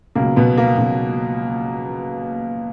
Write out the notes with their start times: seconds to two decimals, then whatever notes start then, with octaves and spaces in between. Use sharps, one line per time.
0.15 C#2 B2 F#3 A#3
0.36 B2 B3
0.58 A#3
0.77 C#2 B2 F#3